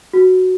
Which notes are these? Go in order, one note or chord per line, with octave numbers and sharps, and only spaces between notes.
F#4